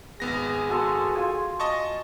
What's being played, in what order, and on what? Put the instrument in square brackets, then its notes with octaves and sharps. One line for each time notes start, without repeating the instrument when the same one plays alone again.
[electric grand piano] G#1 B3 A#6 [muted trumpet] G#4
[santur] F#4 A4 C6
F4 G#5
[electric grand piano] D#5 A5 C#6